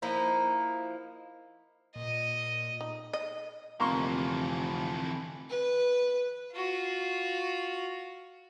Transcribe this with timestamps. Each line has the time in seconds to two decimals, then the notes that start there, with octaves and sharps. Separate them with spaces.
0.02 F3 A#3 D#4 E4
1.96 A#2 D#5
2.81 D#4
3.13 D#5
3.80 F1 D3 E3 F3 A#3 C4 C6 C#6
5.49 B4
6.53 F4 F#4